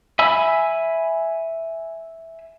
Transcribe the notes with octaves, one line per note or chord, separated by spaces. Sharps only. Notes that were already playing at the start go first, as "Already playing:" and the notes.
E5 G#5 B5 E6